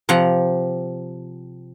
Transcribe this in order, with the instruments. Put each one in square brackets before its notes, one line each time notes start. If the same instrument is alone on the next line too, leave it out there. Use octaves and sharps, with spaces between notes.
[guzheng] C3 F3 F#5 A#5